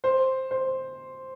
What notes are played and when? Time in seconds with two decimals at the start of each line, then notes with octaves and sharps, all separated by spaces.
0.04 C5
0.51 C5